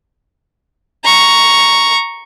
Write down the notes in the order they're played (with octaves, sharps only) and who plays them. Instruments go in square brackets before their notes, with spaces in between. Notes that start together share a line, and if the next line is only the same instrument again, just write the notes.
[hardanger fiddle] A#5 C#6